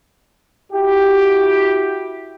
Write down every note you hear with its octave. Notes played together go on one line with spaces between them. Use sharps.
E4 F#4 G4